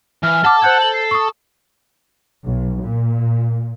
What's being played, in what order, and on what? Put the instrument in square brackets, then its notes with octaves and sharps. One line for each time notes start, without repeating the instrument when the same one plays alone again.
[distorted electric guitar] E3 [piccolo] F6
[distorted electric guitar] A4 A5 [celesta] F#5 D6
[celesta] C5 G6 G#6 [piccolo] F#5
[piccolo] F#7
C7
[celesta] C#6 D#6
[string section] B1
A#2